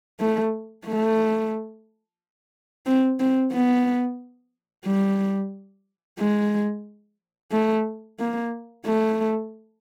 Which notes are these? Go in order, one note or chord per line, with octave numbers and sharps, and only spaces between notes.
A3
A3
C4
C4
B3
G3
G#3
A3
A#3
A3